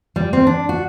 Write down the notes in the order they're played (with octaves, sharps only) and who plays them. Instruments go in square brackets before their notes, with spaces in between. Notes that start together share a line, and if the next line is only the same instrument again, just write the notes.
[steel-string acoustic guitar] G3
C4
D4
F#4